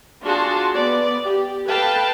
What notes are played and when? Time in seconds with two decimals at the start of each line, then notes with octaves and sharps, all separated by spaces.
0.22 D4 F4 F#4 G#4 A5 C6
0.75 B3 D5
1.24 G4
1.69 A4 B4 F5 G5 A5 B5